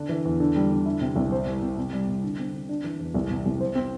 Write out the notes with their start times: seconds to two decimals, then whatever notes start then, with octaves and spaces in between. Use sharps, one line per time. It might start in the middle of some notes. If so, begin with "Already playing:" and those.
Already playing: D3 D4
0.09 E3
0.25 E2
0.40 D3
0.56 G3
0.71 D3
0.86 E4
1.01 C3
1.16 C2
1.32 C5
1.47 G3
1.61 C3
1.77 C3
1.93 G3
2.08 C3
2.24 D3
2.39 C4
2.54 D3
2.69 D4
2.84 E3
2.99 E2
3.15 C2
3.30 C3
3.46 C2
3.60 C5
3.75 C4